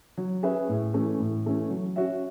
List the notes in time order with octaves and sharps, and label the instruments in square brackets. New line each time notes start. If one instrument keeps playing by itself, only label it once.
[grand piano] F#3
C#4 G#4 B4 E5
A2
E3 A3 C#4
A2
E3 A3 C#4
F#3
C#4 F#4 C#5 E5